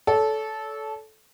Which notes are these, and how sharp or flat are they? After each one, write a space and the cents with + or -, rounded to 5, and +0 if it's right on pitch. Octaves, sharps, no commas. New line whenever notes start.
A4 -15 C#5 +40